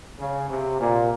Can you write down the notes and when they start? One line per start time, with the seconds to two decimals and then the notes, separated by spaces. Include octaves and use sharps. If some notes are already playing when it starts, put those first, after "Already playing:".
0.19 C#3
0.50 C3
0.80 A#2